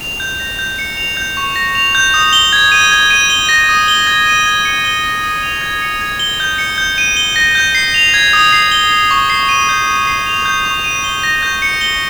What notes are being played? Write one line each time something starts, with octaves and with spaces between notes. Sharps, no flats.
F7
G6
A#6
G6
C#7
F7
G6
C#6
A#6
F7
G6
D#6
G7
G#6
D#7
G#6
D#7
G7
A#6
D#6
G7
G#6
D#7
G#6
C#7
G7
A#6
D#6
F7
G#6
C#7
G#6
G7
G6
C#7
G6
D#7
G7
A#6
G6
C7
F7
G#6
D#6
C7
G7
G#6
C#6
C7
D#7
G6
D#6
C7
F7
G6
C#6
D#7
G7
A#6
G6
C#7
G7